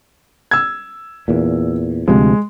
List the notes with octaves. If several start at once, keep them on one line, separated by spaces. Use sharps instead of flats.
E6 G#6
E2 A#2
D2 C3 F3 G#3